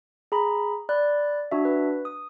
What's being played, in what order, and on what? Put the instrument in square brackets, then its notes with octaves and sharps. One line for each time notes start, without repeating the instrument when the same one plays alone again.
[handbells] G#4 A#5 B5
D5 B5 F#6
D4 F#4 E5
B4
D#6